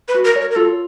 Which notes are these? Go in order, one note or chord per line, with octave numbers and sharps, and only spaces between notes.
B4
F#4
A#4
C#5
A#4
A#4
F4 A4